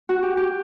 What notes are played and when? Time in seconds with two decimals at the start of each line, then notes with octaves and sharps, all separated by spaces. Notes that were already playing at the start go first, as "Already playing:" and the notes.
0.09 F#4
0.23 G4
0.37 G4